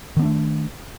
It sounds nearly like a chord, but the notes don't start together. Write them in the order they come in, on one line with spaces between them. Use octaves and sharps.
D#3 B3 D4 A3